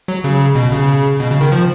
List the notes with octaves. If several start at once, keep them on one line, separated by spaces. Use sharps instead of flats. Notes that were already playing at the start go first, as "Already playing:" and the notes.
F#3
C#3
B2
C#3
B2
C#3
D#3
F3